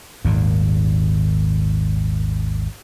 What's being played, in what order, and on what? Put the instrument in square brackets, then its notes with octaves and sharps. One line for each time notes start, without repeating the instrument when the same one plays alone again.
[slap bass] G#1 D#2 A#2